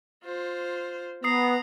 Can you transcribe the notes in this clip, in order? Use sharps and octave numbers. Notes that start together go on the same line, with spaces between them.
F4 C5
B3 A#5 D#6 C7